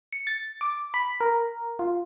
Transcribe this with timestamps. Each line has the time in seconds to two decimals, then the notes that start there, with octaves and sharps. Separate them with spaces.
0.13 C#7
0.27 A6
0.61 D6
0.94 B5
1.20 A#4
1.79 F4